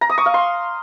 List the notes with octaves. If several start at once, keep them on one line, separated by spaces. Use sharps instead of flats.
A#5
D#6
C#6
F5
C6